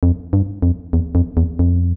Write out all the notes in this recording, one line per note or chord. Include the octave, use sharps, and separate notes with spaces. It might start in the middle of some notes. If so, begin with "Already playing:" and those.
F2
G2
F2
E2
F2
E2
F2